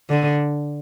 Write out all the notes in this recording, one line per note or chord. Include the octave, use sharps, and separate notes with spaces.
D3